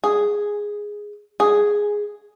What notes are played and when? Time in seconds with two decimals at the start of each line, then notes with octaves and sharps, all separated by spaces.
0.04 G#4
1.40 G#4